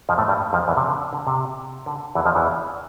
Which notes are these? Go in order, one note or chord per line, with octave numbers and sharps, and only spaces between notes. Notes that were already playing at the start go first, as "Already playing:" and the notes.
F2 F3
A2 A3
G2 G3
F2 F3
E2 E3
C3
D3
D3
C3
D3
E2 E3
F2 F3
E2 E3